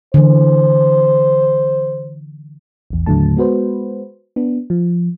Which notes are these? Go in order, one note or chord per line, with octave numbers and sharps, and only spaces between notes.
D3 E3 C5
A#1 E2
D#2 A2 D3 F#3 A3 A5
G#3 B3 F#4 B4 C5
B3 D4
F3